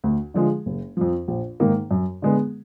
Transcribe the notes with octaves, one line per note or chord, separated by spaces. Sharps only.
D2
D3 F3 G#3
F#1
F2 F3
A#1
G#2 D#3 A#3
F#2
D3 G#3 B3